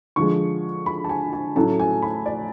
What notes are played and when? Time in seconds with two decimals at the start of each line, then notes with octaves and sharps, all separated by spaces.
0.16 D3 F3 G#3 C#6
0.86 B5
1.04 A5
1.09 G#5
1.33 G#5
1.56 A2 F#3 A3 C#4 A5
1.79 G#5
2.02 B5
2.26 D5